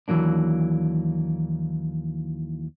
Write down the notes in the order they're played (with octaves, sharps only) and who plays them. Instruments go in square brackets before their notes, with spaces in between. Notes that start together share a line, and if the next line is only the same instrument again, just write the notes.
[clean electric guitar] D#2 E3 F#3 A#3 D4